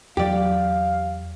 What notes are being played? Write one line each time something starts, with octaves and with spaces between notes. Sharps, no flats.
E2 F#3 G4 D5 F5